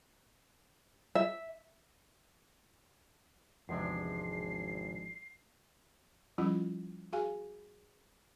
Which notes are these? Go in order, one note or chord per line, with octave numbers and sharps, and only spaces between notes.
E5
G#1 E2 C3 F3 G#3 D4 C7
F3 G3 C#4 E4 F4 D#5
F#4 G#4 F5 G#5